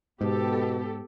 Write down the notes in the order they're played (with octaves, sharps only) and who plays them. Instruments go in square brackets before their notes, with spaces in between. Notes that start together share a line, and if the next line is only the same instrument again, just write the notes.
[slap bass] G#2 [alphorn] B2 [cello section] B3 G4 A4